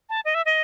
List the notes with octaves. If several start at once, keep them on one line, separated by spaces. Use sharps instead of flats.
A5
D#5
E5
D#5